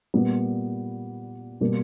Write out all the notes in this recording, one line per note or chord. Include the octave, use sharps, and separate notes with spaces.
A#2 G3 B3
B2 G3 A#3